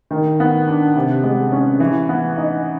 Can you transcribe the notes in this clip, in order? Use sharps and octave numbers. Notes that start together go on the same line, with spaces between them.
D#3
B3
D4
C3
G#3
C#4
E3
B3
D#4